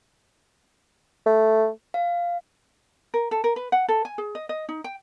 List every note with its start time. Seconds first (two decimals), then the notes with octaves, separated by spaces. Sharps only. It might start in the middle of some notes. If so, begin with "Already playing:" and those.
1.26 A3
1.94 F5
3.14 A#4
3.31 A4
3.44 A#4
3.56 B4
3.72 F#5
3.89 A4
4.05 G#5
4.18 G#4
4.35 D#5
4.49 D#5
4.69 D#4
4.84 G5